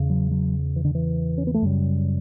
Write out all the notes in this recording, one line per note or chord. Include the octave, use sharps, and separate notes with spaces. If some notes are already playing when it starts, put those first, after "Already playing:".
Already playing: E2 C#3
F#3
F#3
E3
D3
E3
C#4
B3
A3
F#2 C#3 G3